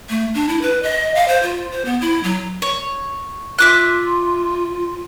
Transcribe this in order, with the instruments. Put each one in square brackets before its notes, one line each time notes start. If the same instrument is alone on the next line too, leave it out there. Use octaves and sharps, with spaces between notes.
[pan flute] A3
D4
E4
B4
D#5
F5
C5
F4
C5
B3
E4
F#3
[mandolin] C#5
[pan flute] F4 [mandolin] E5 D6 F#6